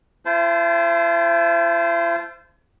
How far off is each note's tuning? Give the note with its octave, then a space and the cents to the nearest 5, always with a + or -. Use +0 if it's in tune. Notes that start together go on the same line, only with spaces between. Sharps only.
E4 +45 C5 -15 A5 -30